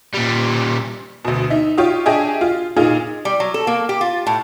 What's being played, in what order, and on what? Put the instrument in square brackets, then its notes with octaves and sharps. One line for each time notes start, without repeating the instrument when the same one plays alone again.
[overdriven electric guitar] A#2 G3
[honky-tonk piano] D2 B2
D#4 E5
F4 G4 C#5 F5 D#6
D4 G4 G#4 D#5 E5 G#5
F4
A#2 D#4 F4 G#4
[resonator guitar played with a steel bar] G3
F#3
A4
A#3
G4
F4
A2